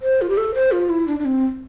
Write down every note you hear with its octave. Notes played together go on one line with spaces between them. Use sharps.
C5
F4
G4
A4
C5
F4
E4
D4
D4
C4